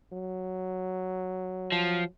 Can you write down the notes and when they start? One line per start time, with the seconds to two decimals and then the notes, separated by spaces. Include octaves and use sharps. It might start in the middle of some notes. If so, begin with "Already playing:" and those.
0.13 F#3
1.72 F3